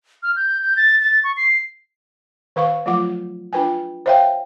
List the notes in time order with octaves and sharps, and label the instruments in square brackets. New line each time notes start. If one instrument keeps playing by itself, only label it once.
[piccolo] F6
G6
G6
A6
A6
C#6
C7
[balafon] D#3 B4 F5 C#6
F3 F#3 A3 F4 F#5 D6
D4 F4 B4 G5 G#5
C5 C#5 E5 F5 G5